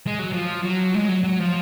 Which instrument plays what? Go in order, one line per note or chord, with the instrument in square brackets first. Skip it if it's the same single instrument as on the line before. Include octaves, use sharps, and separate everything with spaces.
[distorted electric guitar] G#3
F#3
F3
F#3
G#3
F#3
F#3
F3